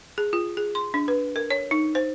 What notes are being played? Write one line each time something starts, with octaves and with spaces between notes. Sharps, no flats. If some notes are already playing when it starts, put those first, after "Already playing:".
G#4
F4
G#4
C6
D4
B4
A#4
C#5
D#4
C5